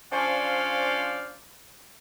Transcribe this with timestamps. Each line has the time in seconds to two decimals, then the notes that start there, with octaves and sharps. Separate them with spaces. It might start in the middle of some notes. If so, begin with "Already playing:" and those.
0.12 F3 C#4 D4 C5 D5 F5